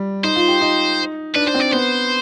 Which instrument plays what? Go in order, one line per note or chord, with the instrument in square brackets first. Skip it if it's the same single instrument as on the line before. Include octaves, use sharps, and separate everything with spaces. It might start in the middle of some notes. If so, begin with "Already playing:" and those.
Already playing: [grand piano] G3
[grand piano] D#4 [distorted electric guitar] C5
[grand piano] F4
G4
D#4
[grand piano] D4 [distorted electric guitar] B4
[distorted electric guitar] C5
[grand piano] C4
[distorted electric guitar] D5
[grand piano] B3 [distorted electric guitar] C5